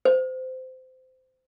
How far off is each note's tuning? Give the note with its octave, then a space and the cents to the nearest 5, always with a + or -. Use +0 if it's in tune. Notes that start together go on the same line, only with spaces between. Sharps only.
C5 -20